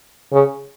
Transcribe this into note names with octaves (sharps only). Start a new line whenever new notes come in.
C#3